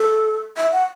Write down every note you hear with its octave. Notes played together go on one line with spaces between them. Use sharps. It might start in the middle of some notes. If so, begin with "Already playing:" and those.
Already playing: A4
E5
F#5